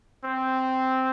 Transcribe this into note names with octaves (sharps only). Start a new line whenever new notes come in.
C4